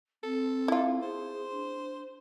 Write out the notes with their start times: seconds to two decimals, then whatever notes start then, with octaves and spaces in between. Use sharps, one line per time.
0.23 C4 A4
0.68 E4 F4
1.03 G#4 C5
1.51 D4